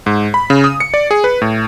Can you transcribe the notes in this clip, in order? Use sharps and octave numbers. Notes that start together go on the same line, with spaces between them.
G#2
B5
C#3
D#6
C#7
D5
G#4
B4
A2